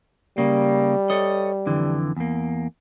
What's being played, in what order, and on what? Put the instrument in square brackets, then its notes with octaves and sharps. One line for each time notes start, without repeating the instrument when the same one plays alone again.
[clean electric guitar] C#3 A#3 [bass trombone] G3
[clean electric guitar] A4 C#5 D#5
F2 D3 E3
E2 A#3